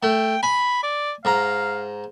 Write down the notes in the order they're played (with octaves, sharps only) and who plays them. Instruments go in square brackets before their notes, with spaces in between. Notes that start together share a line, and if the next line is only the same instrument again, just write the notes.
[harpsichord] A3 [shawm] G5
[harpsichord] G#5 [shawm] B5
[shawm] D5
[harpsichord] G#2 A#5 [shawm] F5